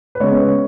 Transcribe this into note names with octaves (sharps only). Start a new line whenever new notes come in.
B4
C#3 G#3 B3 C#5